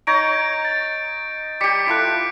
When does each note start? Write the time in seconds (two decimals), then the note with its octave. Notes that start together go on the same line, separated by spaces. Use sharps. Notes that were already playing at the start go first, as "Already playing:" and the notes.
0.07 D#4 C#5 A#5 G6 A#6 D7
0.65 A6
1.61 G3 G4 D6 B6 C#7
1.87 E4 F4 A4 F#6 D7